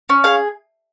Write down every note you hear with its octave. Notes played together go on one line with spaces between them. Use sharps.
C#4
G#4 F5